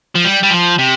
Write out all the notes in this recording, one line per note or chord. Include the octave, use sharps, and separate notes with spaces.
F3
G3
G3
F3
C3